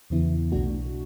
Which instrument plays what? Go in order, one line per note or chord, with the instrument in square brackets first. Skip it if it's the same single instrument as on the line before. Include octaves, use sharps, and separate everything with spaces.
[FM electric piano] E2 C#3 E3 B3 E4
B1 B2 A3 D4 F#4